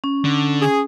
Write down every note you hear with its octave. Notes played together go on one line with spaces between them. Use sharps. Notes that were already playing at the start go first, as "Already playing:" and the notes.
C#4
D3
G#4